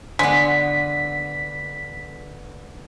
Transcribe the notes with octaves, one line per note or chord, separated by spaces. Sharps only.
D3 G#3 B3 B6